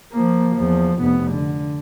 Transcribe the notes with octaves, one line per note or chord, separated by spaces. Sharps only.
F3 A#3
E2 F3
F1 B3
D3